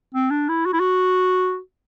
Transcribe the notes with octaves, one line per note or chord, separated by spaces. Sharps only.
C4
D4
E4
F#4
E4
F#4